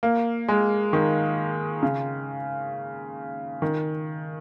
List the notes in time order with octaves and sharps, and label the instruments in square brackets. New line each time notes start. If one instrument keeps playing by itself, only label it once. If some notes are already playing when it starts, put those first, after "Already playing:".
[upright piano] A#3
G#3
D#3
C#3
D#3